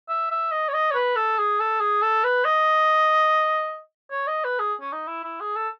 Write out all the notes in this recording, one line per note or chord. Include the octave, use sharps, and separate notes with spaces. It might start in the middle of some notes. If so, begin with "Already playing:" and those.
E5
E5
D#5
C#5
D#5
C#5
B4
A4
G#4
A4
G#4
A4
B4
D#5
C#5
D#5
B4
G#4
C#4
D#4
E4
E4
G#4
A4